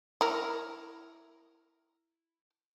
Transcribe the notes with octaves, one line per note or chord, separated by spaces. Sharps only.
E4 A#4